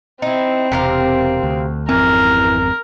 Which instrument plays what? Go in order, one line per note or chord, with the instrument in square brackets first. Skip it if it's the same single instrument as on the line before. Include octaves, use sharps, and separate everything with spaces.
[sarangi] C4 [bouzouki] D#4 E4
[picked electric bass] E1 [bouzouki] C3 A#4 F5
[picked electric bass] D2
[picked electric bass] G#1 F2 C4 [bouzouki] E3 [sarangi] A#4